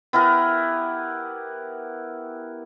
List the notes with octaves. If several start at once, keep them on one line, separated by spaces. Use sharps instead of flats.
B3 E4 G4 A#4